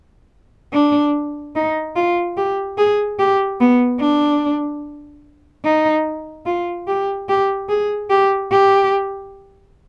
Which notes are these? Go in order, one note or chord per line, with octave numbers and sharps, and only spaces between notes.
D4
D#4
F4
G4
G#4
G4
B3
D4
D#4
F4
G4
G4
G#4
G4
G4